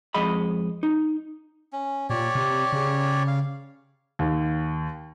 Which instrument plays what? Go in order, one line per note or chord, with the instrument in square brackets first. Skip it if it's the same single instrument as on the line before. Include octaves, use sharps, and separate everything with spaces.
[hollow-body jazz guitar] F2 G#3 D#5 B5
D#4
[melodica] C#4
[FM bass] A#2 [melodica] G4 C#5 D5
[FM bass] C3
C#3
[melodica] F5
[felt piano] D#2